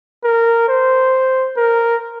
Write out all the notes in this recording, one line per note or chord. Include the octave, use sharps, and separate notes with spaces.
A#4
C5
A#4